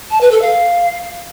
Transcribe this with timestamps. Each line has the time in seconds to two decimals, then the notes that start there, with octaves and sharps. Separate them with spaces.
0.10 A5
0.21 B4
0.31 A4
0.42 F5